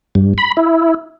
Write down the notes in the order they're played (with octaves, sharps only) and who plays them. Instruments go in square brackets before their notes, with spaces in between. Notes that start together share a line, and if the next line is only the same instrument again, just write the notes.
[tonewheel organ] G2
B5
E4